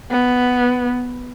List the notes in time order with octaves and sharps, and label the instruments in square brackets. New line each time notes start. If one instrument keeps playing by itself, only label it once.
[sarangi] B3